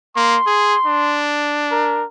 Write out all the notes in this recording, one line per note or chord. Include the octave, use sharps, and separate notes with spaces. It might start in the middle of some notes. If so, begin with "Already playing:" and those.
A#3 C6
G#4
D4
A#4